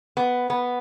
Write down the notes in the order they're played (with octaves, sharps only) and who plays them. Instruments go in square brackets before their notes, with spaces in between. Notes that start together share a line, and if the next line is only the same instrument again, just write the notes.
[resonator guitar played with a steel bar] B3
B3